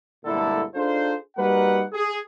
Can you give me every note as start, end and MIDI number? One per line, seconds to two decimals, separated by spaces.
0.25 0.62 31
0.25 0.62 46
0.25 0.62 50
0.25 0.62 56
0.25 0.62 64
0.25 0.62 69
0.74 1.14 62
0.74 1.14 63
0.74 1.14 65
0.74 1.14 68
0.74 1.14 69
0.74 1.14 72
1.37 1.83 55
1.37 1.83 58
1.37 1.83 63
1.37 1.83 66
1.37 1.83 71
1.37 1.83 78
1.93 2.18 68